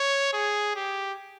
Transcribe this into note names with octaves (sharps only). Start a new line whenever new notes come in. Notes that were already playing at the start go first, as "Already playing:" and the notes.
Already playing: C#5
G#4
G4